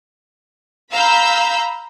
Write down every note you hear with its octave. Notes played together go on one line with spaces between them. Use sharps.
F5 A#5 B5 E6 G6